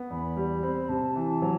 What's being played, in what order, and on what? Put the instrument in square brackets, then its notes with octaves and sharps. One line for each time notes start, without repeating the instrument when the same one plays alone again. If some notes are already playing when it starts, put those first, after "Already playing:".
Already playing: [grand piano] B3
[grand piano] E2 [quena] B5
[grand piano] G3
C4
[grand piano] C3 [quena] A5
[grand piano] E3
F#3